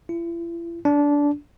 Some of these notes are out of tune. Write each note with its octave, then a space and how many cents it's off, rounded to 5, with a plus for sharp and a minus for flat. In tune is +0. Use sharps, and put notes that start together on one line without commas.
E4 +40
D4 -20